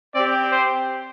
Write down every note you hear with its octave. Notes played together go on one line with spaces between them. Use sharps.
C4 G4 D5
C5